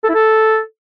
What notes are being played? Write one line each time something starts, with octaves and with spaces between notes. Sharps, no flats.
A4
E4
A4